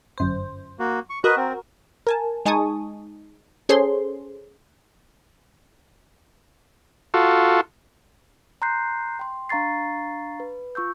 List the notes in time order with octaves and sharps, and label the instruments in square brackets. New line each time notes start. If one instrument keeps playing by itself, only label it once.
[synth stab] G1 F#2 C5
[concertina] A#3 F#4
C#6
[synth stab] F#4 A#4 [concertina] B4 D#5
[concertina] C4
[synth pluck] A#4 G#5 A5
G#3 D#4 G#5 A5 C#6 D#6
C#4 G#4 A4 C5 C#5 C6
[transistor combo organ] F4 F#4 A4
[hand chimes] A#5 C6 F#6 G6 C7
G5 C6
D4 F5 A#5 C#6 A6 C7
B4
F4 C#6 E6 G6